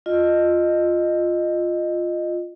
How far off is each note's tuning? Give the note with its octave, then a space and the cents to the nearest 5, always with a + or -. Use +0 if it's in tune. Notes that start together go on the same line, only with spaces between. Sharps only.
F4 +0 D#5 -15